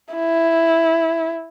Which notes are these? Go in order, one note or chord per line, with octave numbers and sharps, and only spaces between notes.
E4